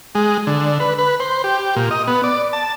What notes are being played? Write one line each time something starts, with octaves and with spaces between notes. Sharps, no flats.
G#3
D3
B4
B4
C5
G4
A#2
D#5
B3
D5
A5